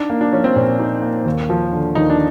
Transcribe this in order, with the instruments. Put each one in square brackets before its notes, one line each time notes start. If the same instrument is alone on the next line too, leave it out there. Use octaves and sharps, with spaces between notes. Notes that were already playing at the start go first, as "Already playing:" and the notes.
Already playing: [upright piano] D4 [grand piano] D#4
[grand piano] A#3
[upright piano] D4
[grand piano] F3 [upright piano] C#4
[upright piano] C4
[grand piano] A#2 [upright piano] C#4
[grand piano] D#4
A#3
D#2
F3
D3
[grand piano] D#2 [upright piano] D#4
[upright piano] D4